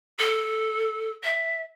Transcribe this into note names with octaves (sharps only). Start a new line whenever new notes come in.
A4
E5